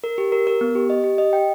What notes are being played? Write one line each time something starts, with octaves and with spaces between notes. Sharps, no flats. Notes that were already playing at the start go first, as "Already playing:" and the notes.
A#4
G4
A#4
A#4
B3
G4
D#5
G4
D#5
G5